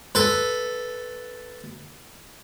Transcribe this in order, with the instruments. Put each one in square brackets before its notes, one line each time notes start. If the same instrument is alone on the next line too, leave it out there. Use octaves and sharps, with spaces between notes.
[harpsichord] A4 B4